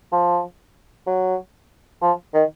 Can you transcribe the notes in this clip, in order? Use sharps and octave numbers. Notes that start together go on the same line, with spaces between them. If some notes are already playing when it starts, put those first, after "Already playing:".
F3
F#3
F3
D#3